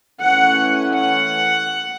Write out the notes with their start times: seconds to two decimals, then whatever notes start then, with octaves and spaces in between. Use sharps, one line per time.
0.21 E3 A3 C#4 F#5
0.96 F#5